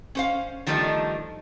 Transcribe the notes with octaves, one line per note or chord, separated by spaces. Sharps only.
C#4 C5 F5
D#3 F3 G3 A3 D4 D#4